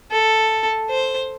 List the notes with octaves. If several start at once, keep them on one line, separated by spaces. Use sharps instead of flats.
A4
C5